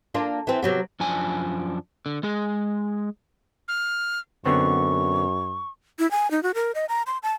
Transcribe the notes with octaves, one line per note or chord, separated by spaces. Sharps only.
A#3 D4 F4
E3 C4
C3 F#3 B3
F#2 F3 D4 G#5
D3
G#3 G#4
F6
F#2 D3 B3 C4 C#6
E4
G#5
D#4
F#4
A#4
D#5
A#5
C6
A5